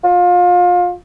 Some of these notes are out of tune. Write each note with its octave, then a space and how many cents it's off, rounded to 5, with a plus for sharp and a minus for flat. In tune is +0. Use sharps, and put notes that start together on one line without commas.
F4 +30